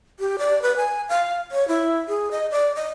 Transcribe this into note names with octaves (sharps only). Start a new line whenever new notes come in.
G4
D5
B4
G#5
F5
C#5
E4
G#4
D#5
D5
D#5